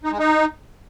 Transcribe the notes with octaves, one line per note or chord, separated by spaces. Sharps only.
D#4
G#3
D#4